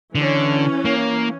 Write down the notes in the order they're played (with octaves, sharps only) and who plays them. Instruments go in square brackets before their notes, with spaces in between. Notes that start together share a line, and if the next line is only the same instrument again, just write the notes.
[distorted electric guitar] D3 [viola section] E3 C#4
[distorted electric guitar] A#3